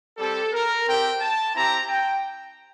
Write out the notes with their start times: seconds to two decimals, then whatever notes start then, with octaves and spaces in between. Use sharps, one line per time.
0.18 G3 C4 G4 A4
0.52 A#4
0.86 C4 G4 G5
1.20 A5
1.54 C4 E4 G4 A#5
1.88 G5